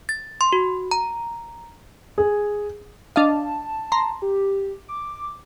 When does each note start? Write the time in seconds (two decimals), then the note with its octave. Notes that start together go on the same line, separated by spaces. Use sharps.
0.09 A6
0.41 C6
0.53 F#4
0.91 A#5
2.18 G#4
3.16 D4 D#5 F5 A5
3.92 A#5 C6
4.22 G4
4.89 D6